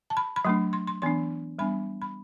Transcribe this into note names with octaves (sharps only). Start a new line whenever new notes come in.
A5
B5
B5
F#3 A3 D4 C6
C6
C6
E3 B3 D4 C6
G3 B3 D4 B5
B5